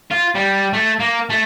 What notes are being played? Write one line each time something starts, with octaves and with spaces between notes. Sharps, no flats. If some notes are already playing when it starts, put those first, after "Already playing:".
F4
G3
A3
A#3
A3